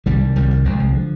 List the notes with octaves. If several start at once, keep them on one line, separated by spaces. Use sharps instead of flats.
C2 D#3 G3
C2
C2 D#3 G3
C2
C2 F3 G#3
C2
D3 F3